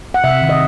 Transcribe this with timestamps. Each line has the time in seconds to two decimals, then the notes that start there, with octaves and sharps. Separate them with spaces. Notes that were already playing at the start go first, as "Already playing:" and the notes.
0.14 F#5
0.24 C3 E5
0.42 D#3
0.49 D#5